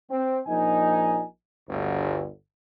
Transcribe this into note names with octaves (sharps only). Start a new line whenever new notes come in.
C4
A#1 D#4 G#5
G1 D2